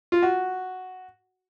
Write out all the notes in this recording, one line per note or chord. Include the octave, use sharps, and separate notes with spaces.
F4
F#4